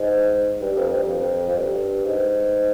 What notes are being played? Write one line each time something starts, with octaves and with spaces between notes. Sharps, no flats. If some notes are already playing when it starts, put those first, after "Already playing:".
Already playing: G#2
G2
F2
G2
F2
F2
G2
G#2